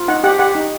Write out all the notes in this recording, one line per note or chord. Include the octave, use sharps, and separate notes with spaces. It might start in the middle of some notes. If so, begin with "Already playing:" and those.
Already playing: F4
D#4 F#5
G4 F#5
G4 F#5
D#4